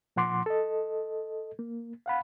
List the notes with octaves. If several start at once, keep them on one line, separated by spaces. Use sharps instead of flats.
A#2 F3 F#5 C6 D6
A4 D#5
A#3
F5 F#5 B5